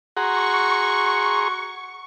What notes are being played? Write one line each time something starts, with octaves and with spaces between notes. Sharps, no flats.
F#4 G#4 A#5 C6 C#6